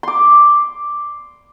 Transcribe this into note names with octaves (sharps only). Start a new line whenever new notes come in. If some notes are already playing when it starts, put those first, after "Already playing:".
C6 D6